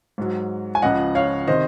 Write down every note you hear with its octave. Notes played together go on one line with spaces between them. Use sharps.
G#2 F#3
G#5
C#2 C#3 F3 D#5 F#5
C#5 F5
C3 D#3 C5 D#5